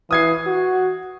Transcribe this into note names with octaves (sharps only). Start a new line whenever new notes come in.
E3 D#6 G#6 C7
F#4